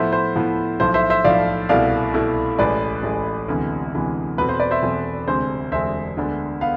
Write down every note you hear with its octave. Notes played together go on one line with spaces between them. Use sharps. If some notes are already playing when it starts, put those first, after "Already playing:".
Already playing: A2 F3 B3 E4 C5 E5
C5
A2 F3 B3 E4
B1 A2 F3 C5
C5 E5
C5 E5
B1 A2 F3 D5 F5
C2 B2 A3 E4 D5 F5
C2 B2 A3 E4
A1 A2 G#3 B4 D5
A1 A2 G#3
D2 C3 E3 G#3 B3
D2 C3 E3 G#3 B3
E1 E2 B2 A3 C4 B4
C5
B4 D5
C5 E5
E1 E2 B2 A3 C4 C5
E1 D2 C3 G#3 C4 C5
E1 D2 C3 G#3 C4 C5 E5
D2 D3 G#3 B3 D4
B3 F5